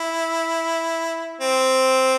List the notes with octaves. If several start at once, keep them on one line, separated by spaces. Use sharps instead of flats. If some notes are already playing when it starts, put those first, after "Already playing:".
Already playing: E4
C4